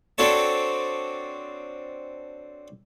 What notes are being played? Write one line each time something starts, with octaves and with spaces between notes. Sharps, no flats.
C4 D4 F#4 A4 C#5 A5